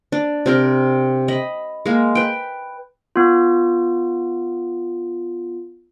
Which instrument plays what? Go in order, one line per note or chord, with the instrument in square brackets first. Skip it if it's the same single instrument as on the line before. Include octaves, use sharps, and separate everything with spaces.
[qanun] D4
C3 C4 A#4
D#5 B5
G#3 A#3
B4 G5
[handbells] B3 F4